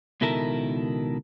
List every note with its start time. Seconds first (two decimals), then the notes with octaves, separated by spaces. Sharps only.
0.21 C#2 B2 D#3 E4 A4 A#4